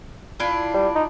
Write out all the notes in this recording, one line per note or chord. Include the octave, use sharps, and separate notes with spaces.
D4 E4 F4
G3
D#4